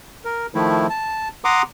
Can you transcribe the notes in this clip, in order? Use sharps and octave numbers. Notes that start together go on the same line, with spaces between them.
A#4
D#3 F3 A3 E4
A5
F#5 A#5 C6 D6 D#6